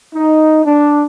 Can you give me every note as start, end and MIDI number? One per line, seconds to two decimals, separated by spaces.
0.14 0.64 63
0.65 1.05 62